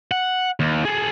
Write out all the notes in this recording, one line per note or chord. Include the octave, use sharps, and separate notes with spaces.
F#5
D#2
G#4 A4